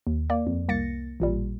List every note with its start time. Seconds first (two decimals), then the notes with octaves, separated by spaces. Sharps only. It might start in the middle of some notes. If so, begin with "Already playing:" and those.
0.07 D#2
0.30 A#3 D5
0.47 F2
0.68 C2 A#3 A6 A#6 C#7
1.20 A1 A#2 G3